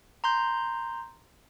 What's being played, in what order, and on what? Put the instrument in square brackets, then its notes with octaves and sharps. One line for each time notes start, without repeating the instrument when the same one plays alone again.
[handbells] A#5 C6 G6